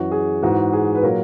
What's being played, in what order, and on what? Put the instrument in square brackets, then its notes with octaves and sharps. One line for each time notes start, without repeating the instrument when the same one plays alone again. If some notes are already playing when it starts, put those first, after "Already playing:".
Already playing: [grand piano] F#2 E3 F#4
G#4
G#2 E3 F#4
G#4
B4
A#2 F#3 A#4